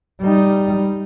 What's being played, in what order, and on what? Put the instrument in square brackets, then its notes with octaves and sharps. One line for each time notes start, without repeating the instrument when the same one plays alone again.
[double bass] G3 D#4